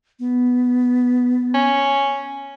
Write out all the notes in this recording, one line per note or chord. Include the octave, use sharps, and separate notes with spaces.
B3
C#4